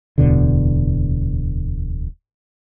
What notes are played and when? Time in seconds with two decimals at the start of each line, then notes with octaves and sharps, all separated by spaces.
0.18 D1 E2 B2 D3